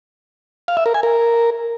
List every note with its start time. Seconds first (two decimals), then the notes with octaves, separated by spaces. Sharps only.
0.68 F5
0.77 E5
0.86 A#4
0.94 G#5
1.03 A#4